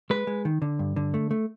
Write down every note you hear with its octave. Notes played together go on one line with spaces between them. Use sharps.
G#3 B4
G#3
D#3
D3
G2
D3
A3
A3